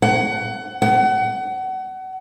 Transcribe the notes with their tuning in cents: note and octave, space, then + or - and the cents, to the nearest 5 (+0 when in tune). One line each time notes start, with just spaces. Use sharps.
F#5 +25
F#5 +30